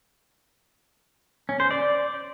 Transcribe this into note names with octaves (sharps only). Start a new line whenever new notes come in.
C#4
C5
D5